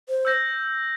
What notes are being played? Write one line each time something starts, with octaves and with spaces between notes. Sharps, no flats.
C5
E6 G6 A#6